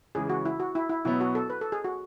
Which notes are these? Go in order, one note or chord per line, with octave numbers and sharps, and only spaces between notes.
C#3 E3 G#3 G#4
F#4
E4
F#4
E4
E4
B2 F#3 B3 E4
F#4
A4
B4
A4
G#4
F#4